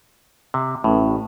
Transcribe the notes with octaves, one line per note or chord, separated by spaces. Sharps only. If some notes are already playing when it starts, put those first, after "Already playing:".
C3
A1 A2